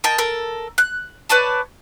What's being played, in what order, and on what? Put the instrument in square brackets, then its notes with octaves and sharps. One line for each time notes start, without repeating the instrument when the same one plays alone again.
[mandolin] A#4 D#5 G5 A5
A4 A#4
F#6
B4 C#5 D5 A5